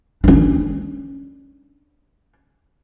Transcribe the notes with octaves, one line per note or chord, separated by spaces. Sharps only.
C#4 D4